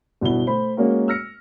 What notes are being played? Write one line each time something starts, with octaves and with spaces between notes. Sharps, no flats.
G1 B2 B3 E4 G7
A3 C5 B5
G#3 A#3 C#4 F#4 A#4
E6 F6 A#6 C#7